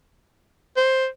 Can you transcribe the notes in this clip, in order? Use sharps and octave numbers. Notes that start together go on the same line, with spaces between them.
C5